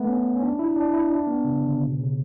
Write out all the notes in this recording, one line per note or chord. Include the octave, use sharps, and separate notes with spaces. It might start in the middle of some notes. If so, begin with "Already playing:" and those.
Already playing: A3 B3
C#4
C#4
D4
E4
D4
E4
D4
B3
C#3
D3
C#3
B2
C#3